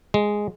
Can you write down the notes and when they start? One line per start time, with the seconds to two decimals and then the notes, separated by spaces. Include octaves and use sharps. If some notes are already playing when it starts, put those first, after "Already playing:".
0.14 G#3